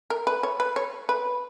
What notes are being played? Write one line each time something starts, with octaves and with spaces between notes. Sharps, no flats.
A#4
B4
C#5
B4
C#5
B4